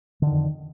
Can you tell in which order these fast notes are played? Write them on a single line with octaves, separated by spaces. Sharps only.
D3 D#3 F2